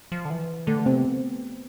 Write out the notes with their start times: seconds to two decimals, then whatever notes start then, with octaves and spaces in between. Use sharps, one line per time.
0.12 F3
0.25 D3
0.30 E3
0.67 D3 A3
0.79 A3
0.86 C3 C4
0.92 B3